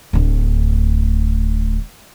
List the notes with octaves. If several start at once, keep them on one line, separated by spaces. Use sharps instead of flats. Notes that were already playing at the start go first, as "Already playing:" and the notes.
D1 D2